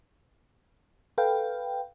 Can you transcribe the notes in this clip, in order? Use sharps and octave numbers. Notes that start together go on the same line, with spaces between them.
A4 B4 F5 G5